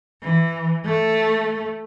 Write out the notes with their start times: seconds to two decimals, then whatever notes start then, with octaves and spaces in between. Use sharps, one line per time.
0.23 E3
0.85 A3